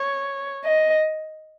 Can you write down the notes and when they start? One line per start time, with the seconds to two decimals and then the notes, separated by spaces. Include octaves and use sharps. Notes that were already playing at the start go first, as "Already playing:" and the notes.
Already playing: C#5
0.64 D#5